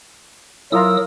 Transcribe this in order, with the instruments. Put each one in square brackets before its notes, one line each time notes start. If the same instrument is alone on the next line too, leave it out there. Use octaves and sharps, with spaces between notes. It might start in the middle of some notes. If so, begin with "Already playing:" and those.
[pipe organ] F#3 D#6 E6 [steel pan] E4 F4 A#5 [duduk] A#4